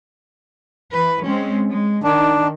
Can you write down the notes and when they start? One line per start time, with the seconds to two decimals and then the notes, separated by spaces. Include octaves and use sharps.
0.91 E3 B4
1.25 G#3 C4 C#4
1.70 G#3
2.03 D#3 D4